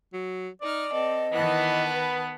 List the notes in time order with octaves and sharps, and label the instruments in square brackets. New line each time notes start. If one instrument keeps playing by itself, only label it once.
[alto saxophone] F#3
[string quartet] D#4 F6 [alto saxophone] D5
[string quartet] C4 A4 [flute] D#5
[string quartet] D#3 A5 F#6 [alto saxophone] E3 [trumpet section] B3
[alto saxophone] B4